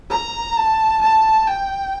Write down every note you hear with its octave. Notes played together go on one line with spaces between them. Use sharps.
A#5
A5
A5
G5